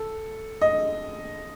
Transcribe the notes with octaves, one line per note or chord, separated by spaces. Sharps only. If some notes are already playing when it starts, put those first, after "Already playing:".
Already playing: A4
D#5